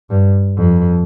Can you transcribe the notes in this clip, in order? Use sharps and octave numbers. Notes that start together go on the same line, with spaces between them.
G2
F2